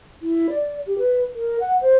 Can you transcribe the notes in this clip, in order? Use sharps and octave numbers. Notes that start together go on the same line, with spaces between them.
E4
D5
G4
B4
A#4
F#5
C5